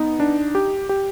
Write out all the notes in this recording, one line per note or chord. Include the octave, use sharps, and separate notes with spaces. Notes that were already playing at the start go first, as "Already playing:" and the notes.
Already playing: B3 D#4
D4
G4
G4